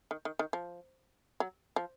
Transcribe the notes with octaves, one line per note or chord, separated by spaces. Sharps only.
D#3
D#3
D#3
F3
F#3
F3